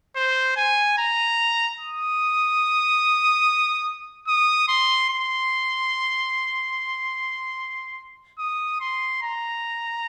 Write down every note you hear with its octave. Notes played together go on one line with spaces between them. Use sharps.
C5
G#5
A#5
D#6
D#6
C6
C6
D#6
C6
A#5